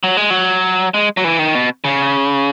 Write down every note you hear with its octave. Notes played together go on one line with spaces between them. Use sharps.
F#3
G#3
F#3
G#3
F#3
E3
D#3
B2
C#3